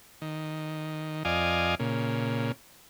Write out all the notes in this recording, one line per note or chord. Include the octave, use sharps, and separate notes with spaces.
D#3
F2 D5 D#5 F5 G#5
A#2 C#3